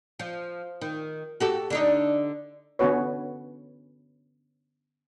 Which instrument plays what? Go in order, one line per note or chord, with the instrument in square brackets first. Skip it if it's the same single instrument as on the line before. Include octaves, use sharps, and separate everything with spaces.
[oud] F3
D#3
F#4 G4 A4
D3 D4 D#4
[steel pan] D3 B3 C#4 F#4 B4 C#5